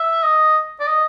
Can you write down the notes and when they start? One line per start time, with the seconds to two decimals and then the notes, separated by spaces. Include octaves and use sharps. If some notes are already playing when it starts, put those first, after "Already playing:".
Already playing: E5
0.23 D#5
0.80 D5
0.87 D#5